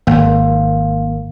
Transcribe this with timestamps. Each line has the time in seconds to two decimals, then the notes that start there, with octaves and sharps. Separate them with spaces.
0.07 G#1 A#3